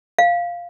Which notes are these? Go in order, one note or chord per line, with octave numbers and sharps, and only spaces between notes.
F5